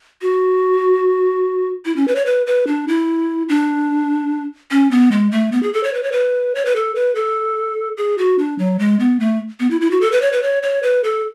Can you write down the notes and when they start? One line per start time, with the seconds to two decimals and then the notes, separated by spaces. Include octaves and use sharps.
0.22 F#4
1.85 E4
1.96 C#4
2.08 B4
2.15 C#5
2.26 B4
2.47 B4
2.67 D4
2.88 E4
3.49 D4
4.71 C#4
4.91 B3
5.12 G#3
5.32 A3
5.52 B3
5.63 G#4
5.73 A4
5.84 C#5
5.94 B4
6.03 C#5
6.12 B4
6.55 C#5
6.65 B4
6.76 A4
6.95 B4
7.15 A4
7.97 G#4
8.18 F#4
8.38 D4
8.59 F#3
8.79 G#3
8.99 B3
9.20 A3
9.60 B3
9.71 E4
9.81 E4
9.91 F#4
10.01 A4
10.12 B4
10.22 C#5
10.32 B4
10.43 C#5
10.63 C#5
10.83 B4
11.04 A4